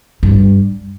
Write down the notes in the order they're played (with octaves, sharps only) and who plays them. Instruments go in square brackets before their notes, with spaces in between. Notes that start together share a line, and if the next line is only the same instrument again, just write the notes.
[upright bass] G2